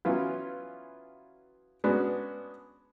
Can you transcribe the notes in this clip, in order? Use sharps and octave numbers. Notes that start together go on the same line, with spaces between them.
E3 F#3 B3 C#4 F4
G#3 B3 C#4 D4 F#4